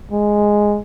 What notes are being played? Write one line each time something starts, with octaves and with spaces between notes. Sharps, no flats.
G#3